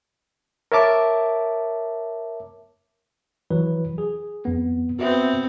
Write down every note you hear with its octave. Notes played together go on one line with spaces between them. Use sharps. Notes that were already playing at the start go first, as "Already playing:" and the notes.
A#4 C#5 E5 A5 D6
E3 F#3 B4
G#4
F2 B3
B3 C4 F#4 E5